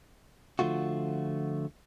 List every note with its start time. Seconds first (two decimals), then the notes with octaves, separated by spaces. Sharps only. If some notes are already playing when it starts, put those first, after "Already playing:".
0.59 D3 F3 A3 F4 F#4